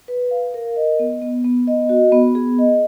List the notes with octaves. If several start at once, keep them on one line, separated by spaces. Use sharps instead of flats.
B4
F5
A#4
D#5
B3
B3
B3
D#5
F#4
B3
G#4
D#5